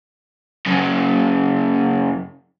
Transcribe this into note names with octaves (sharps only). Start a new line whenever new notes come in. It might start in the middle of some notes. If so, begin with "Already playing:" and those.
F#2 C#3